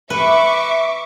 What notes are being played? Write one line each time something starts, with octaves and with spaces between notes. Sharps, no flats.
B4 E5 C#6 D6